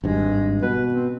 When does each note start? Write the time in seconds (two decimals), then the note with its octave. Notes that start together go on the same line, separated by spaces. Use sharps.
0.04 G#1 G2 G#3
0.63 B2 B4
0.94 C4